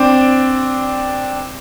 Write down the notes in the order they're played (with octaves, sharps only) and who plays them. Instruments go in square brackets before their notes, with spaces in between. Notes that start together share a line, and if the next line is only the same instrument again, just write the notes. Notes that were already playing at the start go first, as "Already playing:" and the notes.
Already playing: [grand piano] C4 D4